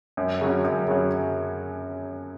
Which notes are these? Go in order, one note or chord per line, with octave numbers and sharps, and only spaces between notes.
F#2
C#3 F#3
F#2
C#3 F#3